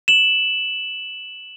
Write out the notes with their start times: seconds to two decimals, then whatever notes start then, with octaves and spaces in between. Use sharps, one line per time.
0.08 E7 F#7